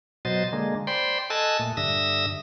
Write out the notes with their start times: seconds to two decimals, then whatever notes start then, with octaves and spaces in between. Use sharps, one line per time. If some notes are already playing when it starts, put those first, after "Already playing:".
0.25 B2 F#3 C5 D#5 A6
0.52 D3 G#3 A#3
0.87 C5 D5 G5 B5 C6
1.30 A4 D#5 G#5 A5 E6 F#6
1.59 A#2 A3
1.77 G2 D3 E5 D#6 E6 A#6